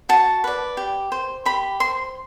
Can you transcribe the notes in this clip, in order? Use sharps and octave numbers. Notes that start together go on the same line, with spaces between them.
F#4 A5
B4 D5
G4
C5
G4 B5
C5 C6